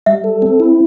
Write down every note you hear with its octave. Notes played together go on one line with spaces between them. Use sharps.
G3 E5
A4
C4
E4